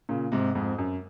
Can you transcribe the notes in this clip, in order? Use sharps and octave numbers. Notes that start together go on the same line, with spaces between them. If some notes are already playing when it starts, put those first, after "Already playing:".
A#2 C#3
G#2 C3
F2 G#2
F#2